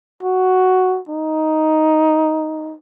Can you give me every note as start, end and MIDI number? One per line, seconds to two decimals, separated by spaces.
0.23 1.00 66
1.09 2.75 63